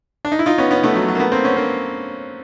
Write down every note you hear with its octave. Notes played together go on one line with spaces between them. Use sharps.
D4
D#4
E4
D#4 F4
B3 C#4
B3 C#4
A3 B3
F#3
F#3
A#3
A3 B3
A#3 C4
B3 C#4
A#3 C4